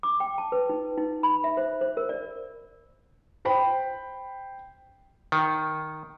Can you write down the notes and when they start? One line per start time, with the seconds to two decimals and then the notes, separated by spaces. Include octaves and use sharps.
0.03 D6
0.20 G5
0.38 A5
0.52 B4
0.69 D#4
0.98 D#4
1.23 B5
1.44 E5
1.57 C5
1.81 C5
1.97 A#4
2.09 D5
3.45 C5 G5 B5
5.32 D#3